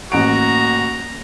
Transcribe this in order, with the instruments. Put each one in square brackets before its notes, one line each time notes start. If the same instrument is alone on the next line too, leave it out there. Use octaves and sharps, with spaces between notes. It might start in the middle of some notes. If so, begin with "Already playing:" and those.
[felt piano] A1 D7 [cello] A#3 [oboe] F#4 [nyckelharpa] A#5